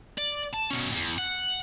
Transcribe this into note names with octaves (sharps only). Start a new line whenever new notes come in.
D5
A5
B2 C#4
E2 B2
F#5